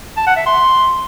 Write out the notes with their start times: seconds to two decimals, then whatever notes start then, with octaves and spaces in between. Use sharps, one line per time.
0.17 A5
0.27 F#5
0.36 E5
0.46 C6